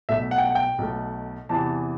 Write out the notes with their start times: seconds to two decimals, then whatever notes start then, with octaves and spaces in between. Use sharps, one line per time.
0.09 B1 B2 A3 E5
0.31 F#5
0.38 G5
0.46 F#5
0.55 G5
0.78 B1 B2 A3
1.49 E2 C3 E3 A5